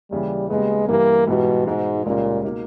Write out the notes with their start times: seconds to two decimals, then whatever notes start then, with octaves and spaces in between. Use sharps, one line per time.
0.11 D#2 C#3 E3 G3
0.50 D#2 C#3 G3 G#3 B3
0.89 G2 E3 G3 A#3
1.27 G#2 B2 E3 G3
1.67 G#2 B2 G#3 D#4
2.06 C#2 A#2 C#3 G3 C#4
2.45 B2 A#3 D#4